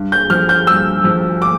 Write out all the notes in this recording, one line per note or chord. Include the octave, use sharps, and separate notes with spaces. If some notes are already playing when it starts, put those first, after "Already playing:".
Already playing: G2
G6
F3 F6
G6
G2 E6
F3
D6